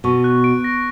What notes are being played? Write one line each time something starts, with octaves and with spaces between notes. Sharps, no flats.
B2 C#6
F#6
D7
A#6